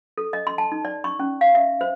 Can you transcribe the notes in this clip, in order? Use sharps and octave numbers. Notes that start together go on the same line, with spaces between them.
A4
D#5
C6
A5
D#4
D5
C#6
C#4
F5
E5
C5